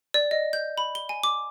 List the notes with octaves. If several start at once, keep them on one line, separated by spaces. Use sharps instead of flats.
D5
D#5
G6
B5
G7
G#5
D6